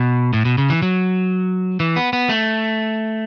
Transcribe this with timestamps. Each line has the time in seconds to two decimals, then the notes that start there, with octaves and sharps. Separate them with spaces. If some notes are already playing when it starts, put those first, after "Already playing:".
Already playing: B2
0.33 A2
0.45 B2
0.58 C#3
0.70 E3
0.82 F#3
1.80 E3
1.96 B3
2.13 B3
2.29 A3